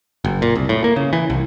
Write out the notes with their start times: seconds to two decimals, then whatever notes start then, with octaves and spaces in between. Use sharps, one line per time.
0.25 F#1
0.42 A#2
0.56 C2
0.69 A2
0.84 A#3
0.96 C#3
1.13 E3
1.30 C2